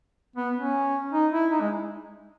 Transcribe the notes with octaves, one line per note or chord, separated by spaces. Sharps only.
B3
C#4
D#4
E4
D#4
G#3